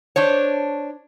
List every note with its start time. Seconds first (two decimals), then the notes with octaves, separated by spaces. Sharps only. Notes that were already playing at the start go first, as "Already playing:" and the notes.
0.16 D4 C5 C#5